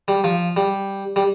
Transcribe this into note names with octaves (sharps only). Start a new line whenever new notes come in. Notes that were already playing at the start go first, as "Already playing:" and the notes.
G3
F3
G3
G3